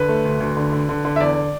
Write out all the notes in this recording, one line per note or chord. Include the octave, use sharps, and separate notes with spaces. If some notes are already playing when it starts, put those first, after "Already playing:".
Already playing: D3 B4
A3
D2
D2
D3
D3
D3
D3
E5
E2 D5